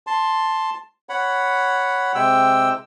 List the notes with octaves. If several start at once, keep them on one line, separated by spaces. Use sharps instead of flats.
A5 C6
C#5 F#5 B5
C3 G#3 G5 E6